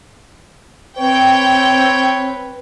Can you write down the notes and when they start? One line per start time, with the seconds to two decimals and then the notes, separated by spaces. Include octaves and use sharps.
0.98 C4 B4 C#5 G5